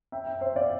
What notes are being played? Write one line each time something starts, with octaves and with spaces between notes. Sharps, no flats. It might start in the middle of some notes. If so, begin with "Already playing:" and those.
E5 G5
E5 G5
C5 E5
D5 F5